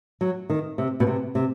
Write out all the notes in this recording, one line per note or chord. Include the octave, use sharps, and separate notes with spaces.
F#3
D#3
C3
B2
C3
C3